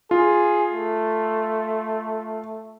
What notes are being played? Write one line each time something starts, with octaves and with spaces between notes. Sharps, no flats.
F4 G#4
A3